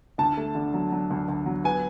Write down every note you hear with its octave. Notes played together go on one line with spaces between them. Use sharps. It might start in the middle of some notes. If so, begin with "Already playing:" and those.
D2 A5
A3
D3
F#3
F#3
D2
D2
F#3
B3 G#5